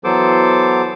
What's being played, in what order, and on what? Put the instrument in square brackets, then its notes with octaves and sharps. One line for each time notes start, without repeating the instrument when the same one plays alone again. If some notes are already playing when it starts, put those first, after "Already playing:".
[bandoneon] E3 F#3 B3 A4 C5 D6